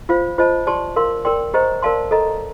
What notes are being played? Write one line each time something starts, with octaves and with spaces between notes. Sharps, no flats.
F4 C5 F5
F4 C5 D#5 A5
G4 D5 A5 C6
A#4 F5 C6
A#4 D5 G5 C6
G4 C5 D#5 A#5
A#4 D5 F5 A5 C6
A4 D#5 A#5